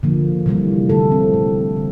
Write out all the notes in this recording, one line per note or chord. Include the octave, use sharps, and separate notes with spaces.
D3 F3 A#3
C3 E3 G3 A#3
D3 A3 A4
C4
A#2 A3
D3